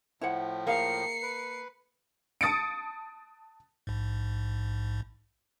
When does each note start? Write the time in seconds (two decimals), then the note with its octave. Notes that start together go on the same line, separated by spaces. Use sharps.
0.21 A2 F3 E4 C5 F#5
0.67 A#3 G#4 E5 F5 C7 C#7
1.22 B4
2.41 A5 D#6 A6 C#7 D7
3.87 A#1 G#2